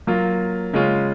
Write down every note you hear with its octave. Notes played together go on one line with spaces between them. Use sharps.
F#3 A#3 F4
C#3 G#3 C#4 F4